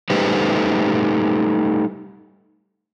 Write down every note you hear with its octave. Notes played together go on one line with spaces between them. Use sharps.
G3 A3 D#4 G4 B4 C5